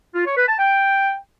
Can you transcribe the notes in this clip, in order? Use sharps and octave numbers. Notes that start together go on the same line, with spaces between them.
F4
C#5
B4
A5
G5